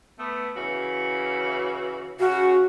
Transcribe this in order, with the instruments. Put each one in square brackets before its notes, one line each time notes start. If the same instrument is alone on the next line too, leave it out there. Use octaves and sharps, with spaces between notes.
[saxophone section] A3 B3
C#3 E3 F#4
[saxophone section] C#3 [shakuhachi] F#4